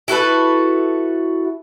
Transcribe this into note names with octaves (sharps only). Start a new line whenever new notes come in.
E4 F#4 A4 B4